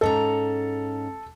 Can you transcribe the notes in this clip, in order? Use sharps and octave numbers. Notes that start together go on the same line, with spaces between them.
G#2 C#4 A4 A#5